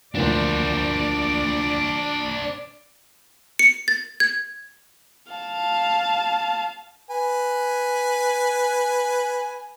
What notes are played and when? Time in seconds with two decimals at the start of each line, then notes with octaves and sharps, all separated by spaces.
0.15 D2 A#2 F3 D4 C5 D5
3.59 C#7
3.88 A6
4.20 G#6
5.32 F5 A5
7.10 B4 G#5